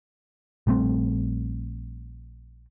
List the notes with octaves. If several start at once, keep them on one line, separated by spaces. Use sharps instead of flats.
A#1 G3 A3 C4